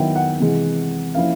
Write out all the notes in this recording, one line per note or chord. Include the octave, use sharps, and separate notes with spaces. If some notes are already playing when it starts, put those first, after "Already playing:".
Already playing: D#3 F#3 B3 E4 G5
F#5
C3 E3 G#3
F3 A#3 C#4 E4 F5